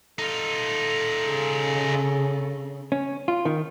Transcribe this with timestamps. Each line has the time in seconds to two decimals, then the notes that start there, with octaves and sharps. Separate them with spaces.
0.19 D#4 F4 A4
1.28 C#3 G#4
2.92 C#4
3.28 F4
3.45 D#3